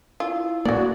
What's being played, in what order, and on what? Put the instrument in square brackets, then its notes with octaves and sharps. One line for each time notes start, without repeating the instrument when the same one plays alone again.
[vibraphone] E4 [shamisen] F4
[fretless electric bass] A2 A#3 [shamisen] F#3 D5 [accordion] F#4